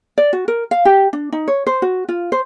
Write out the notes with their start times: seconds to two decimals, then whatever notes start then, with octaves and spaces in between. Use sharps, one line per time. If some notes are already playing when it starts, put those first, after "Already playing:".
0.18 D5
0.33 F#4
0.48 A#4
0.71 F5
0.85 G4
1.13 D4
1.32 D#4
1.48 C#5
1.67 C5
1.82 F#4
2.09 F4
2.32 C5